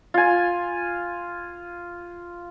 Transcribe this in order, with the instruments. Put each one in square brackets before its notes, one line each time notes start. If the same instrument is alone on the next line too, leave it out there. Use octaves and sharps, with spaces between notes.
[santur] F4 G#5